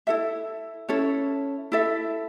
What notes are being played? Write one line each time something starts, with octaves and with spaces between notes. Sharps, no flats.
E4 A4 E5
C#4 E4 A4 C#5
E4 A4 E5